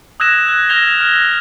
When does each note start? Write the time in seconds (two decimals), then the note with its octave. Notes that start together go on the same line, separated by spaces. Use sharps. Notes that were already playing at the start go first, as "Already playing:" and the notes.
0.20 D#6 E6 F#6 G#6 A#6 E7
0.48 F#6
0.69 F6 G#6 A#6 F7 G7
1.00 F6